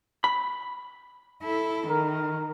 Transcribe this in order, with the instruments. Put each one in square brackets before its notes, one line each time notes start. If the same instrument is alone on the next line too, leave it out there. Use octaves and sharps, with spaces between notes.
[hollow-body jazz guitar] B5
[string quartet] E4 A4
[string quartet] D#3 [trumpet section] A#4